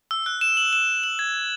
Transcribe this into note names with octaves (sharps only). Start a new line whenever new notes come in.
E6
F#6
E7
F#7
E7
F#7
G#6